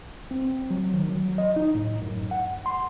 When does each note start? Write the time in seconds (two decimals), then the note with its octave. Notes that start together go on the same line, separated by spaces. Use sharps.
0.31 C4
0.70 F#3
0.93 D#3
1.09 F#3
1.38 D#5
1.56 D#4
1.75 A2
2.02 F#2
2.31 F#5
2.66 C6